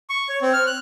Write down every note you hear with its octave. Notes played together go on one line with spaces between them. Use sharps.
C#6
C#5
C4
F6
F#6